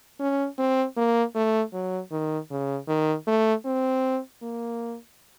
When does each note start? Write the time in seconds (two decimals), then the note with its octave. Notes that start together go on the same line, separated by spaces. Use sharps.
0.19 C#4
0.58 C4
0.97 A#3
1.35 A3
1.73 F#3
2.12 D#3
2.50 C#3
2.88 D#3
3.27 A3
3.65 C4
4.42 A#3